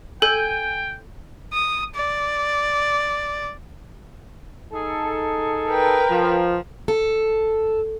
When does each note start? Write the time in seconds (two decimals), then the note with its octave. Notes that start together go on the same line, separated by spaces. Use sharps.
0.22 A4 G5 G#5 G6
1.53 D#6
1.95 D5
4.73 D#4 G#4 A4
5.68 A#4 B4 G5
6.09 F3
6.88 A4